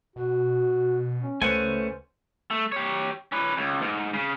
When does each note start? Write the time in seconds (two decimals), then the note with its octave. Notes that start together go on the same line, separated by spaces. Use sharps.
0.16 B2 F#4
1.21 C#4
1.42 C#2 A3 C#4 B4 C5 F#5 G#5
2.51 A3
2.72 G4 C#5
3.32 C#4 B4
3.57 C#2
3.82 G#2
4.14 C#3